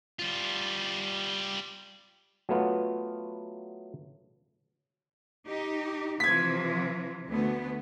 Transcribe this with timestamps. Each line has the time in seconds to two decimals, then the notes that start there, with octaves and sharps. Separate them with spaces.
0.19 G3 F4
2.49 F#3 A3 B3 F4
5.45 D#4 G4
6.20 C3 E3 F3 G#6 B6
7.28 D2 A3 B3